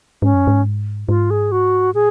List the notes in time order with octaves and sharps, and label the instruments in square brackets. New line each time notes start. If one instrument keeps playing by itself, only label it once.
[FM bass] G#2 [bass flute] C#4
[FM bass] F#2
G#2
[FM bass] G#2 [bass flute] F4
[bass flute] G#4
F#4
[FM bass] A#2 [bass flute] G#4